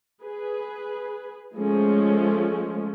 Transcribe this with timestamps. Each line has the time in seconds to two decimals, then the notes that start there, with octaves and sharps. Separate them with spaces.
0.22 G#4 B4
1.56 F3 G#3 A3 C#4